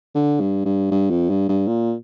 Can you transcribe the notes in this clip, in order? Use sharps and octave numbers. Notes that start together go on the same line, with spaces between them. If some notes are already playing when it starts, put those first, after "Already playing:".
D3
G2
G2
G2
F2
G2
G2
A#2